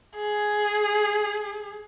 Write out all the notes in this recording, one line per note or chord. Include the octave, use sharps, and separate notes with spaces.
G#4